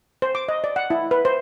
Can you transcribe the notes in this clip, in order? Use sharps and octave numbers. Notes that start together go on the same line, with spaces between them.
C5
D6
D#5
D5
F#5
E4
B4
C5